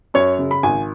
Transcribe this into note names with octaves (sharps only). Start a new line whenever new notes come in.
F#2 C#5
C#3
B5
G#1 G#5